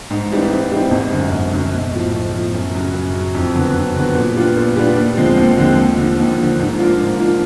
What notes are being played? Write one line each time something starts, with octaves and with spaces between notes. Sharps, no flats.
G#2
E3 G3 C4 D#4
G#2
E3 G3 C4 D#4
G#1
F#2 D3 F#3
G#1
F#2 D3 F#3
B1
A2 F3
B1
A2 F3
F#2
C#3 F#3
F#2
C#3 F#3
F2
D3 F#3 B3
F2
D3 F#3 B3
A#2
G3 B3 D4 F4
A#2
G3 B3 D4 F4
D#2
D3 F3 G#3 C4
D#2
D3 F3 G#3 C4
D#2
D3 F3
D#2
D3 F3
G#2
F3 A#3 D4 F4
G#2
F3 A#3 D4 F4